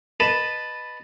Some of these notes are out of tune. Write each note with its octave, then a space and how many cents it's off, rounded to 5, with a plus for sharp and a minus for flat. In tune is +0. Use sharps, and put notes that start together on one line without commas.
B4 +0 D#5 -20 A5 +0